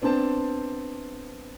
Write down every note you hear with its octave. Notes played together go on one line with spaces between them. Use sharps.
B3 C4 D4 C5 A5